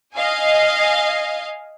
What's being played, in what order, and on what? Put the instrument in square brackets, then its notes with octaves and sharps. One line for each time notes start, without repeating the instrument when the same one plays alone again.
[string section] D#5 F5 G#5